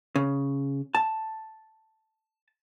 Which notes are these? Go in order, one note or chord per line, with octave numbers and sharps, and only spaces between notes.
C#3
A5